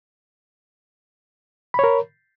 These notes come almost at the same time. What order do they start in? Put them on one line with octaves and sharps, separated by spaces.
B5 C#5 A#4